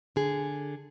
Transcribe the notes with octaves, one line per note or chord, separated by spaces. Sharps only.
D3 G#4